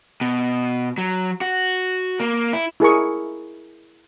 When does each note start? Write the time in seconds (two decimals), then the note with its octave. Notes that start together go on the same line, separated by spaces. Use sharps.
0.21 B2
0.98 F#3
1.41 F#4
2.20 A#3
2.53 E4
2.80 E4 G#4 A#4 C#6